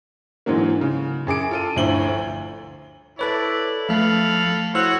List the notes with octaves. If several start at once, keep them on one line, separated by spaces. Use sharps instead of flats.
G#2 D3 E3 F#3 A#3
C#3
F#2 G#4 D6 D7
F4 A4 D#7
G1 D2 F3 E4 F#7 G7
E4 A4 B4 C#5 D5
F3 A3 A4 F5 B5
E4 F#4 C5 C#5 F#5 E6